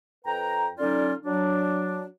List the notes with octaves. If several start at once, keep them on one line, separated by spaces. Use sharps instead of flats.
F2 B4 G5 A#5
D3 F#3 C#4 D#4 F4 D5
F#3 D4